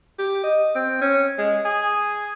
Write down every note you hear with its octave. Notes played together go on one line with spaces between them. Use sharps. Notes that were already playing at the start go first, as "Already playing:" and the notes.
G4
D#5
C4
C#4
G#3
G#4